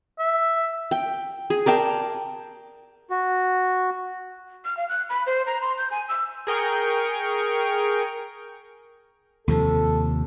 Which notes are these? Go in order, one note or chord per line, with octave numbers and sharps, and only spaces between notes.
E5
G5
G#4
A#4 D5 G5 A5
F#4
F6
F5
F#6
B5
C5
A#5
C6
G6
G#5
E6
G#4 A#4 G5 C#6
D#2 C3 F3 A4